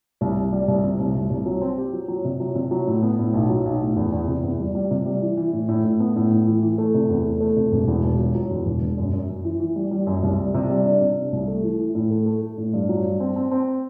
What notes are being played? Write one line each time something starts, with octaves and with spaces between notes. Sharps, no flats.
C2
C2
G3
C2
C3
C2
C2
C2
F#3
C4
G4
F#3
F#3
C3
F#3
C3
F#3
A2
B3
A2
B1
F#3
B1
A2
E2
E2
C3
E2
G3
G3
C3
G3
E3
E3
A2
A2
A2
B3
A2
A2
E3
E3
A3
C3
E2
A3
A3
C3
E1
E2
E1
F#3
F#3
E2
E1
E1
F#2
F#2
F#2
E3
E3
G3
G3
F#2
C2
G3
C3
G3
D4
C3
D4
C2
A3
E3
E3
A2
A3
A3
A3
A2
G2
F#3
G2
C4
C4
C4